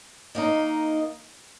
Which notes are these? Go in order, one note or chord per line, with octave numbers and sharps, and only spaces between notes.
D#3 A#3 D#4